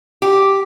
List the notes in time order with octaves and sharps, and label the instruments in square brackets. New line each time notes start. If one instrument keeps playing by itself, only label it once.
[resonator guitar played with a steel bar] G4